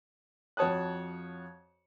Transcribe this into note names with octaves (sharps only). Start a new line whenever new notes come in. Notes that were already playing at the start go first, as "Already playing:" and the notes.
F2 F#4 C#5 A5 D#6 F#6